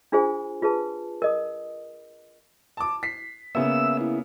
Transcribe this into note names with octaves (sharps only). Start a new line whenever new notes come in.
D4 F4 G#4 C5 G#5
F4 G#4 B4 A5
A#4 D#5 D#6
A5 D6
B6 C7
C#3 A#3 B3 E5 E6
E4